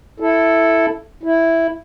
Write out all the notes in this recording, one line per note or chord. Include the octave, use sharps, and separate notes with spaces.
E4 A4
E4